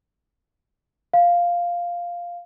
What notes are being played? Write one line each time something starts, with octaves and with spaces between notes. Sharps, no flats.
F5